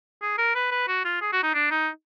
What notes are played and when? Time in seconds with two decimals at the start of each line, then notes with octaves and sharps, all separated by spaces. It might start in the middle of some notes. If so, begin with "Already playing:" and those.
0.22 G#4
0.38 A#4
0.55 B4
0.71 B4
0.88 F#4
1.05 F4
1.21 G#4
1.33 F#4
1.43 D#4
1.54 D4
1.71 D#4